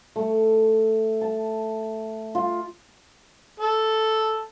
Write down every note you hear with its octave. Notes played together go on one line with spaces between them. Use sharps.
A3
A5
F4
A4